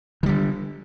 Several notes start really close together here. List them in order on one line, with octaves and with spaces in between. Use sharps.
D#3 G3 D3